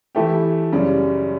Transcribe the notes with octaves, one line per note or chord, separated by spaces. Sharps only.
E3 A3 E4 G4
F#2 C#3 G3